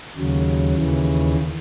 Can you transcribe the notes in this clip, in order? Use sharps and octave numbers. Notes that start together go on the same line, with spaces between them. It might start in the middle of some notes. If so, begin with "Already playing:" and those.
D#2 C#3 F#3
D#2 C#3 E3